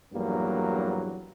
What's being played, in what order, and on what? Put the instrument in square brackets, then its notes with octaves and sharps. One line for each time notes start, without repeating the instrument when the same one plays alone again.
[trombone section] A#1 E2 G2 F#3 A#3